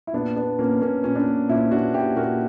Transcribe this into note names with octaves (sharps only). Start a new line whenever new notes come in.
E4
A#2 B3 D4
A#2 B3 D4
A#2 A#3 C#4
A#2 A#3 C#4
A#2 C#4
B3 D4
A#2
A#2 C#4 E4
A#2 D4 F#4
A#2 E4 G4
A#2 F#4 A#4